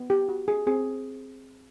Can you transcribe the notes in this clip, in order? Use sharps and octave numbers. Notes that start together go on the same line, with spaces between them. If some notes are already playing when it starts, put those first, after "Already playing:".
Already playing: B3
G4
F#4
G#4
C4 G#4